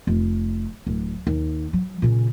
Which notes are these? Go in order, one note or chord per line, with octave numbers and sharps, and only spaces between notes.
F1
D1
D#2
F#3
A#2 C#3